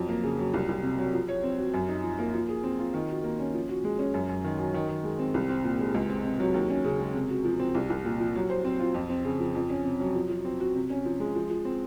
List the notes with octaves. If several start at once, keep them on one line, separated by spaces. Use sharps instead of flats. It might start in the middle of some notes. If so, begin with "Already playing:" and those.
Already playing: F2 F#3
A#3
C#3
F#3
C2
C2
C3
F#3
F3
C#5
C4
F#4
F#2
D#4
F3
A#3
F3
G#4
C4
F4
D#3
F#4
A#3
C#4
F3
F#4
G#3
C#4
F#2
F#2
D#3
F#3
D#3
D#3
G#3
C4
C2
C4
A#2
G#3
C#2
C4
C3
F#3
D#2
C#4
C#3
G#3
C3
F#4
F3
C4
C2
C2
A#2
F3
F#3
C5
C4
F4
F2
C4
C#3
F3
F2
C#4
C3
F#3
F3
F3
C4
F#4
C3
C#4
F3
G#3
F3
F3
C4